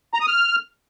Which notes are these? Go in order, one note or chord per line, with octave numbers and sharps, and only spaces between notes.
A#5
D#6
F6